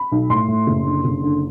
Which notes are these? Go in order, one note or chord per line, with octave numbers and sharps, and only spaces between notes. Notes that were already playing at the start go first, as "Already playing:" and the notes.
Already playing: B5
B1
A2 C6
A2
F#1
D3
F#1
D3